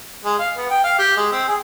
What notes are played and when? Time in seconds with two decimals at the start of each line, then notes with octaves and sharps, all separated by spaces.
0.25 G#3
0.39 F5
0.56 B3
0.70 G5
0.84 F5
0.99 G4
1.16 G#3
1.32 C4
1.48 G#4